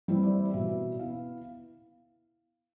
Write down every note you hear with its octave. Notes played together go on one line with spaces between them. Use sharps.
E3 G3 C4 E4
D5
B2 E5
B3 E4 F5